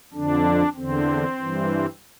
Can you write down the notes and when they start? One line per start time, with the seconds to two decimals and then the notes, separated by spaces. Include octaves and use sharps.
0.13 F2 D3 D4
0.75 E2 D3 C4
1.37 G2 E3